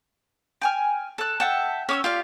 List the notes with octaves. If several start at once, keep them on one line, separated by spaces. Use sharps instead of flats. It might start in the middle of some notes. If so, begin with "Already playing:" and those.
G5 G#5 F6
A4 A5 F#6
E5 F#5 G5 A5
C#4 C#5 D6 E6
F4 G4 D5 F5